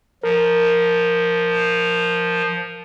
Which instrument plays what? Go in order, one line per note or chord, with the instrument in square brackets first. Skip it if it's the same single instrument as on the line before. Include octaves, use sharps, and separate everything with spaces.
[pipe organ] F3 [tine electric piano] A#4